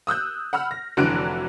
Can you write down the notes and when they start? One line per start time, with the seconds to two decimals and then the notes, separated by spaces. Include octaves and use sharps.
0.07 D#6 E6 F#6 G6
0.53 F#5 B5 E6 F6
0.71 A#6
0.97 F1 D3 E3 F#3 F#6 D7